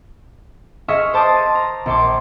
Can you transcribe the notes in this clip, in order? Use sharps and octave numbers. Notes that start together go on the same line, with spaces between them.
G#4 D#5 E5 C#6 F6
C5 A5 D6 D#6
D#7
A#5
A#1 C6 D6